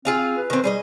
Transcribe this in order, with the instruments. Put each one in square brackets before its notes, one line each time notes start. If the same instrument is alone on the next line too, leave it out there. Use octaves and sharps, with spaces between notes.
[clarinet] C4 [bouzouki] F4 G#4 F5
[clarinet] B4
[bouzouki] D#3 C4
[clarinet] G3 [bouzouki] G#4 C#5 D#5